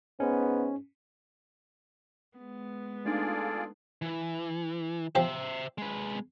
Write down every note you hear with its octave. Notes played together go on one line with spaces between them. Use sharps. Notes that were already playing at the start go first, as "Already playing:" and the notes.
G#2 B3 C#4
G#3 B3
A3 D4 D#4 F4 G#4 A4 D5
E3
F3 G4 C5 E5
G#3 B4